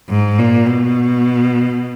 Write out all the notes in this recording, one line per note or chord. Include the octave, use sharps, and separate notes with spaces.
G#2
A#2
B2